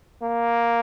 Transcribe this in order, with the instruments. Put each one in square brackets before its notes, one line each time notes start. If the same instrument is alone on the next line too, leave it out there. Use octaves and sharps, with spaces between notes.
[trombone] A#3